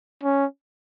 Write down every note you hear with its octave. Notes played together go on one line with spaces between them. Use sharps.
C#4